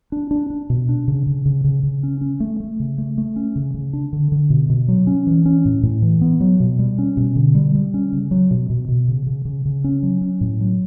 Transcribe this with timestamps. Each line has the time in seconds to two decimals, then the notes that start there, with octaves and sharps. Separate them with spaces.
0.12 D4
0.31 D4
0.50 D4
0.70 B2
0.89 D4
1.08 C#3
1.27 C#3
1.45 C#3
1.64 C#3
1.83 C#3
2.03 C#4
2.21 C#4
2.40 A3
2.60 A3
2.80 C#3
2.98 A3
3.18 A3
3.36 C#4
3.56 C#3
3.74 C#3
3.93 D4
4.13 D3
4.32 D3
4.50 B2
4.70 B2
4.88 F#3
5.07 C#4
5.27 E3
5.46 C#4
5.65 A2
5.83 A2
6.02 E3
6.21 B3
6.41 F#3
6.60 B2
6.79 G3
6.99 C#4
7.17 B2
7.36 D3
7.55 G3
7.75 G3
7.94 C#4
8.12 C#3
8.31 F#3
8.51 B2
8.70 B2
8.88 B2
9.08 C#3
9.26 C#3
9.45 C#3
9.65 C#3
9.84 C#4
10.03 F#3
10.21 C#4
10.41 A2
10.60 F#3